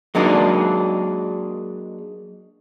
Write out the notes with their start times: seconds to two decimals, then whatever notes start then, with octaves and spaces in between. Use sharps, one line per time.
0.15 F#3 G#3 A#3 D4 D#4